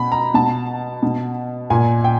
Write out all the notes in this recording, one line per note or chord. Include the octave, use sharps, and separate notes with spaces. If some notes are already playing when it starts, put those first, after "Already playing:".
Already playing: B2 B5
A#5
B2 A5
B2
A#2 G#5
G5